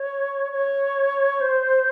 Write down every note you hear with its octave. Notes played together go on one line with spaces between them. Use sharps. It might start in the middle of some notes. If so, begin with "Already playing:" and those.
Already playing: C#5
C#5
C5